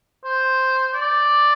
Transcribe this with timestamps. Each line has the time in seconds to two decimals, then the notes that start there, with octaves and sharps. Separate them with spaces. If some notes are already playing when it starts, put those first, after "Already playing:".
0.24 C5
0.94 D5